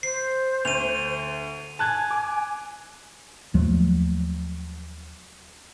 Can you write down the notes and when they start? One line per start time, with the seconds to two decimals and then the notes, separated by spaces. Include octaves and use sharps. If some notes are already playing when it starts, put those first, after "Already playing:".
0.03 C5 C7
0.65 D2 D#7 F7
1.79 G#5 A5 F#6 G#6
2.11 D6
3.54 D#2 F3 F#3 A3